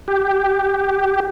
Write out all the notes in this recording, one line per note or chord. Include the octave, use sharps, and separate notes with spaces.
G4